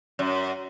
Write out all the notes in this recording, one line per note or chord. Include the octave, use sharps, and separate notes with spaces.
F#2